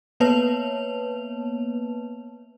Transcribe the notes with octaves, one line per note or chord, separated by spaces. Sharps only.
A#3 B3 B4 C#5 A5 F7